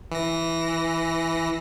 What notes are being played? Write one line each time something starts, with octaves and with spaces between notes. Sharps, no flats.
E3 A#6